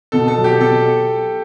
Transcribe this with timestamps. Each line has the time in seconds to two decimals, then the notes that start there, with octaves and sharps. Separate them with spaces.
0.12 B2 A4
0.28 A4
0.37 F#3
0.44 G4
0.60 B2 A4